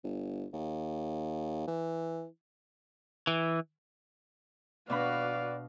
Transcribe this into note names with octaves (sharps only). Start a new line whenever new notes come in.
G1
D#2
E3
E3
B2 D4 F#4 B4 D5 F5 B5